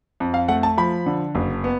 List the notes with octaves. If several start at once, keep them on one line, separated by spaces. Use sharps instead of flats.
F2
F5
A3 F#5
A5
F3 B5
D3
F#1
B3